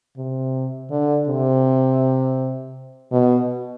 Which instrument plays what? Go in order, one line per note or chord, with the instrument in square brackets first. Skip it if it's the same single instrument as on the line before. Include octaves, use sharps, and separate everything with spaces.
[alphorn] C3
D3
C3
B2